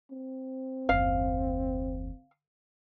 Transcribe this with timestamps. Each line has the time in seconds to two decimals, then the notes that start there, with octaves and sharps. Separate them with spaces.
0.11 C4
0.89 F#1 D#2 F5